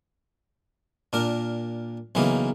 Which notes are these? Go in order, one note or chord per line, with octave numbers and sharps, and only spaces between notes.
A#2 D4 A#4
B1 C#3 E3 A#3 D#4